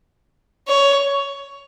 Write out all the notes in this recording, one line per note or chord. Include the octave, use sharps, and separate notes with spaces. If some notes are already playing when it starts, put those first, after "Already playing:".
C#5